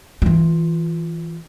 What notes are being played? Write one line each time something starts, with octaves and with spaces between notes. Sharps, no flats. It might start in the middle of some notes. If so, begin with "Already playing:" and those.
E3 F4